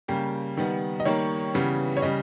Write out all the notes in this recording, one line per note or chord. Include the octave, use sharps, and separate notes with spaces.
C#3 G3 A#3 G5
D#3 G3 B3
D#5
D#3 G3 A#3 C#5
C#3 E3 G3 B3
C#5
C#3 G3 D#5